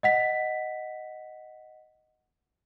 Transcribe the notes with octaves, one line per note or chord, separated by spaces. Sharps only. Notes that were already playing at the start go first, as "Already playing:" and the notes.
D#5 F#5 B6